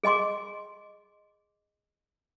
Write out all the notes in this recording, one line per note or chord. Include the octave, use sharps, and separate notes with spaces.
G#4 D#5 G#5 C6 D6